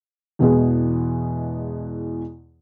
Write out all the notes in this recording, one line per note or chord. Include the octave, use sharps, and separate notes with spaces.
E2 B2 E3 G#3 B3